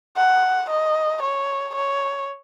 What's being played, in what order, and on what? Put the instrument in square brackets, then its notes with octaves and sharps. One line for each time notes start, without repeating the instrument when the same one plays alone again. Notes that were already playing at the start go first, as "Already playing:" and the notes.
[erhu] F#5
D#5
C#5
C#5